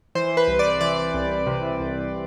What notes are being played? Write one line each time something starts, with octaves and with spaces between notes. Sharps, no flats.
E3 C5
B4
C2
D5
E3 D5
C2
C3
C2